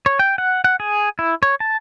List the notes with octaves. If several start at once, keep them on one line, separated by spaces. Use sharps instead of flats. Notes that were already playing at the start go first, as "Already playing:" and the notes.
C#5
G5
F#5
F#5
G#4
E4
C#5
A5